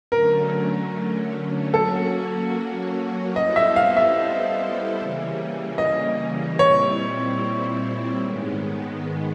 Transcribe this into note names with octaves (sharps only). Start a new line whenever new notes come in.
D3 F#3 A3 C#4 A#4
F#3 A#3 C#4 F#4 A4
G3 B3 E4 A4 C5 D#5
E5
F5
E5
C#3 E3 G3 A#3 C#4
D#5
A#2 G3 C4 E4 C#5
G#2 D#3 G#3 B3